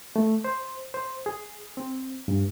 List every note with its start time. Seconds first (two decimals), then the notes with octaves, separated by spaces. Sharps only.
0.16 A3
0.44 C5
0.94 C5
1.26 G#4
1.77 C4
2.28 G2